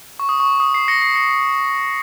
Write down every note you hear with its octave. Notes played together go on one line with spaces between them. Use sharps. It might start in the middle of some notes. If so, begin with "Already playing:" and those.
C#6
D#6
C#6
D#6
C7
A#6 C#7
C7
A#6 C#7